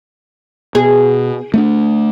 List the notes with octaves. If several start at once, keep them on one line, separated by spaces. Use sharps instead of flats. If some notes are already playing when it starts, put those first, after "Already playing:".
B2 G#4
A3 B3 D4